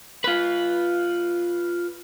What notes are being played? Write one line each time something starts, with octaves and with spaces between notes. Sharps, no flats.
F4 B4